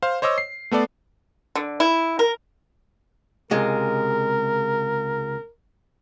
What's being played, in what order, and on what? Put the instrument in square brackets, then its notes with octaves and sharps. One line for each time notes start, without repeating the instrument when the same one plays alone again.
[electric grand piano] C5 F5
C5 C#5 D#5 D6 E6
C7
A3 B3 A4 D5
[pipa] D3
E4
A#4
[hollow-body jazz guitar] C#2 C3 G#3 [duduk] A#4